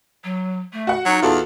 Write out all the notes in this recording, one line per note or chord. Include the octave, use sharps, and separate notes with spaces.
F#3
A3
F#4 F#5
F#3 D#4
E2 F4 F#4 A4